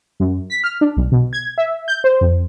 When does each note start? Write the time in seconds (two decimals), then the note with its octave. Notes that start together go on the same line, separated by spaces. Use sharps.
0.20 F#2
0.50 B6
0.64 F6
0.81 D4
0.97 B1
1.12 B2
1.33 G#6
1.58 E5
1.88 G6
2.04 C5
2.21 F2